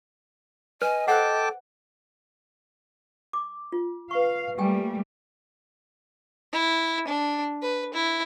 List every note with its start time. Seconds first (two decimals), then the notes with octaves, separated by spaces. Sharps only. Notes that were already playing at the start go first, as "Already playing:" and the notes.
0.82 B4 D#5 G#5
1.08 A4 C5 F#5 G5 A5 D6
3.33 D6
3.72 F4
4.11 B4 F5 C#6
4.58 G3 A3 A#3 G4 G5 G#5
6.53 E4
7.08 D4
7.62 B4
7.94 E4